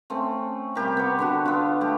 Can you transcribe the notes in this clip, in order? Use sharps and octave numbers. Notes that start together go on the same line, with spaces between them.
A3 C4 C#4
C3 G3 G4 A#4
B3 C#6
D3 D4 F#4
B3 F4
A3 G4